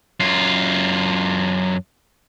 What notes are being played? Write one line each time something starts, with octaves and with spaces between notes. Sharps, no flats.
F#2 F4